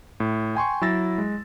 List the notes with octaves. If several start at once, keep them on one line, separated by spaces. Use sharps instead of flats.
A2
G5 G#5 C6 C#6
F#3 E4 E6 A6 A#6
G#3